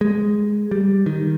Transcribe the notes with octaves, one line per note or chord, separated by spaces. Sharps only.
G#3
G3
D#3